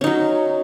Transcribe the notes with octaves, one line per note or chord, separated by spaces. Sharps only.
F#3 C#4 D#4